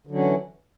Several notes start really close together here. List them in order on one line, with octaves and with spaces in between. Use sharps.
D3 F#3 C#4 E3